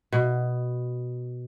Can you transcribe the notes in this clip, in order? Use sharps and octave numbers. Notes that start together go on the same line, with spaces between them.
B2